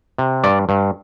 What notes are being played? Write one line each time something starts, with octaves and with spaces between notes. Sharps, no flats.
C3
G2 D5
G2